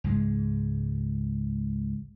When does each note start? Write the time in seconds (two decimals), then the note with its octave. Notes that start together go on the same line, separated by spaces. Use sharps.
0.04 C#2 G#2 G#3